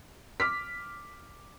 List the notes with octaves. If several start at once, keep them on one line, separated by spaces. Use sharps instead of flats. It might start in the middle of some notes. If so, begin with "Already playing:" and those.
D6 F6 B6